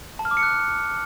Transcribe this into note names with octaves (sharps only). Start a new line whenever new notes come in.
A5
F6
D6
C#7
F#6